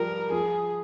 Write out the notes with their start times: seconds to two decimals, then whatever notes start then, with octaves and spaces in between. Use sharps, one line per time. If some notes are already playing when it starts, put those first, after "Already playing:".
Already playing: F3 G3 A#4
0.32 F3 G#4